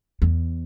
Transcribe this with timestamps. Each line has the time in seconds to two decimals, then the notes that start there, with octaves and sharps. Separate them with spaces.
0.22 E2